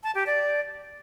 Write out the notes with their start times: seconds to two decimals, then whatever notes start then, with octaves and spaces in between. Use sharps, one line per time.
0.04 A5
0.15 G4
0.26 D5